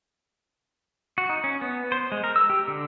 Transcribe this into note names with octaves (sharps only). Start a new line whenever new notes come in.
F#4
D#4
C#4
B3
C5
G#3
A#4
E6
G4
D3